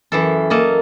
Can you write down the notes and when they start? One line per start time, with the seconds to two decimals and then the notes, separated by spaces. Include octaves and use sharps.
0.12 F#2 E3 A4
0.50 A#3 A4 D#5